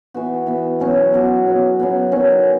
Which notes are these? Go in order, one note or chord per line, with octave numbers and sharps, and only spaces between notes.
E3 B3 F#4
E3 B3 F#4
B2 F#3 C#4 F#4
B2 F#3 C#4 F#4
C#3 F#3 B3
C#3 F#3 B3
D#3 F#3 C#4 F#4